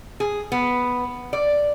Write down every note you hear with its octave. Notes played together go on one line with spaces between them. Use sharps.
G#4
B3
D5